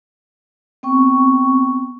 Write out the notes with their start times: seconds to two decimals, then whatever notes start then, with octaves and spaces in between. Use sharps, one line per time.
0.83 B3 C4 G5 C#6